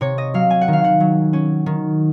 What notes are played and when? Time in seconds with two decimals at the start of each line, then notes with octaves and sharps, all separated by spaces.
0.01 C3 C#5
0.18 D#5
0.34 F#3 F5
0.50 G#5
0.61 F#5
0.68 D#3
0.73 F5
0.84 F#5
1.00 F#3
1.33 C#4
1.66 D#3